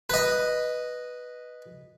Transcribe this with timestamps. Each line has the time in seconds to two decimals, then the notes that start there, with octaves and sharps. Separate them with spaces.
0.10 B4 D#5